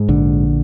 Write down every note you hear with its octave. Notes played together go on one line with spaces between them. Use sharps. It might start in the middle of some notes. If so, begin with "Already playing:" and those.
Already playing: G#2
A#1 D3